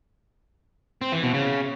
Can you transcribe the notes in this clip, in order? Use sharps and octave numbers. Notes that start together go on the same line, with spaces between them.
C4
E3
B2
C#3